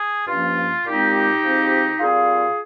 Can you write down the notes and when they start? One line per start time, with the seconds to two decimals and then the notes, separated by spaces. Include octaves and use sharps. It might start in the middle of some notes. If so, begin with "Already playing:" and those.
Already playing: G#4
0.27 G2 F3 A#3 C#4 F4
0.85 A#2 G#3 C4 D#4 G4
1.43 G#2 F3 C4
2.00 A#2 G3 C4 F4 G#4